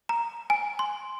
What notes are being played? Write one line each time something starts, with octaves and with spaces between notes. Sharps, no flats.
A#5
G#5
C6